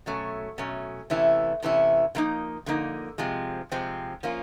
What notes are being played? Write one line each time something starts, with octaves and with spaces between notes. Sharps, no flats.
B2 F#3 A3 C#4
B2 F#3 A3 C#4
C3 E3 A3 C#4 E4
C3 E3 A3 C#4 E4
D3 F3 A#3 D#4
D3 F3 A#3 D#4
C3 F3 G#3 C4
C3 F3 G#3 C4
F3 A#3 C#4 F4